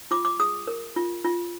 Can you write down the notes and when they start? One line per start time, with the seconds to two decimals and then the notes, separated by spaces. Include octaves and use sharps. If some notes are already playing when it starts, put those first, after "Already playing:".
0.11 F4 D6
0.25 D6
0.40 G#4 D#6
0.67 A#4
0.96 F4
1.25 F4